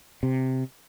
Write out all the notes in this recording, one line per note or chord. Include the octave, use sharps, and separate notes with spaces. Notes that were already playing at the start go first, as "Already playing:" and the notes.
C3